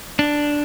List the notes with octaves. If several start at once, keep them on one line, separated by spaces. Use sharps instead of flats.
D4